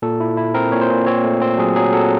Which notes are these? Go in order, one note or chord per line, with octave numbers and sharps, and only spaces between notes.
A#2 A4
E4
E4
C4 A#4
A#2 C#5
C5
A#2
C4 C#5
A3
C4
F#3 G#4
F#3 G#4
F#3 A4